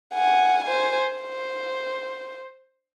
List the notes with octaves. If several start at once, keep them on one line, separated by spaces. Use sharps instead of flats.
F#5 G#5
C5 G#5
C5